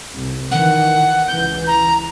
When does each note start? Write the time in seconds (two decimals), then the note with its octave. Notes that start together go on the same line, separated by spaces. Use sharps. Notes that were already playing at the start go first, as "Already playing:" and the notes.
0.14 C2
0.51 D#3 E3 F#5
1.27 C#2 E3 G6
1.66 A#5